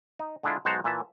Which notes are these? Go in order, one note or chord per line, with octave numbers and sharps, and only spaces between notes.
D#4
D3 G#3 D4 E4 F4
B1 G#3 F#4 C5 A5 A#5
A#2 E3 E5 A5